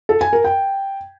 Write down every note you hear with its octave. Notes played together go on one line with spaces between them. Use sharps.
A4
G#5
A#4
G5